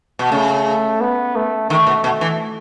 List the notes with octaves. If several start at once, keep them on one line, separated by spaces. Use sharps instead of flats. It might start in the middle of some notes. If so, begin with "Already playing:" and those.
B2
C#3 A3
B3
A3
D#3 A3
B2
B2
E3